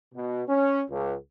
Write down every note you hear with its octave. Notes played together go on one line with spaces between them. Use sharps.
B2
C#4
C#2